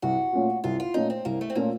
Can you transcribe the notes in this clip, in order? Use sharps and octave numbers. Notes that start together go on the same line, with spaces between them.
C2 F#4
A#2 A3 C#4 F4
C2 F4
F4
A#2 A3 C#4 D#4 F4
C4
C2 A#3
A3
C4
A#2 A3 A#3 C#4 F4